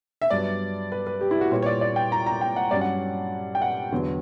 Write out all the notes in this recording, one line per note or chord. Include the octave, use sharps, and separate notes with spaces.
E5
G2 F#3 B3 D5
B4
B4
G4
E4
F#4
A#2 G3 B3 C#5
C#5
D5
D5
G5
A#5
A#5
G5
F#5
G2 F#3 C#4 D5
F#5
G5
F#5
E2 D3 F#3 B3